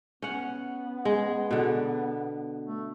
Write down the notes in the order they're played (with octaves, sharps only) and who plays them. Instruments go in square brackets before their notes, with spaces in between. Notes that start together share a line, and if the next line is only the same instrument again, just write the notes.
[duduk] B3 [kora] C#4 F#5
[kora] G#3
B2 D3
[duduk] A3